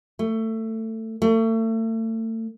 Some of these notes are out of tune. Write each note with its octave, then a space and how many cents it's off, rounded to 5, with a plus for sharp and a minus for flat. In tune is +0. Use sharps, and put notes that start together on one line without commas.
A3 +20
A3 +35